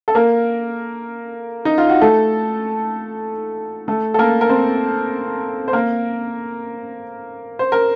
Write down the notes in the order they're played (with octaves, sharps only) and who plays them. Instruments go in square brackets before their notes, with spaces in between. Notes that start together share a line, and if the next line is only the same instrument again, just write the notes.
[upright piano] A4
A#3 A#4
D#4
F4
F#4
A3 A4
A3 A4
A4
A#3 A#4
A#4
C4 C5
C5
A#3 A#4
C5
A#4